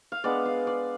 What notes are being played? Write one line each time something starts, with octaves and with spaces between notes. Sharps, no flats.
F5
G#3 B3 D4 D5
F5
D5